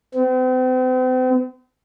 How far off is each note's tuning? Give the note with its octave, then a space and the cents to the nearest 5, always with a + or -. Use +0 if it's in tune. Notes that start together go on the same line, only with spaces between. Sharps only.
C4 -40